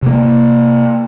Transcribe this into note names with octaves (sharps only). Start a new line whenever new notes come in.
C3 A#3